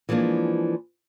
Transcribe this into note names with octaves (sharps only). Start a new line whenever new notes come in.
E3 F3 G#3 A#3 D4